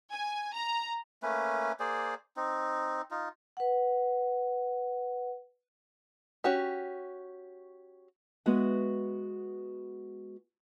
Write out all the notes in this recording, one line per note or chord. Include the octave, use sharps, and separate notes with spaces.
G#5
A#5
A3 A#3 C#4 B4
A#3 G#4 C5 D5
C4 D#4
D#4 F4
B4 F#5
C#4 F#4 G4
G#3 B3 F#4 B4 E5 F#5